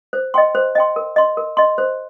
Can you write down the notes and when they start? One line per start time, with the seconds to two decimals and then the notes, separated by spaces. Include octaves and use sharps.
0.13 C5
0.34 D#5 G5 C6
0.55 C5
0.75 D#5 G5 C6
0.96 A#4
1.16 D#5 C6
1.37 A#4
1.57 D#5 C6
1.78 C5